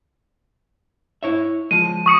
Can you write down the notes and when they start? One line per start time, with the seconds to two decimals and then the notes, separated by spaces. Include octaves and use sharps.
1.23 E4 C#5 E5
1.71 F3 G#3 D#7
2.06 C#6 D#6 C#7